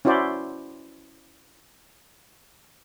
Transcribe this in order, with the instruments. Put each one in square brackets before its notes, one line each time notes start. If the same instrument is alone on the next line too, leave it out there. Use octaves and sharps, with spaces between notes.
[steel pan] C#4 E4 F#4 C5 D5